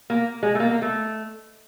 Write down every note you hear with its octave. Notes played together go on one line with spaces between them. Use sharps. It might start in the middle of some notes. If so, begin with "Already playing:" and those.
A#3
G#3
A3
A#3
A#3
A3